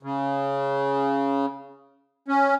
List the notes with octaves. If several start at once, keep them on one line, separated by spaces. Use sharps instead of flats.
C#3
C#4